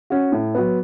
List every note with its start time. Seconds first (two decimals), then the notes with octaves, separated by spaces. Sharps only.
0.10 C#4 F#4
0.32 A2
0.55 F#3 B3